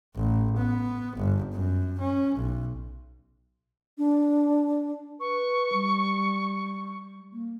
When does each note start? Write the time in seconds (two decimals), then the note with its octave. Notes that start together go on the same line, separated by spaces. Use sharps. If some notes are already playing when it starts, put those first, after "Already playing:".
0.15 A1
0.57 B3
1.17 G1
1.53 F#2
2.00 C#4
2.35 B1
3.98 D4
5.20 B4 C#6
5.73 G3
7.33 A#3